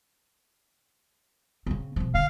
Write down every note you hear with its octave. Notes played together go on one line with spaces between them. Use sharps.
C#3 C4
B1 F3
D3 F5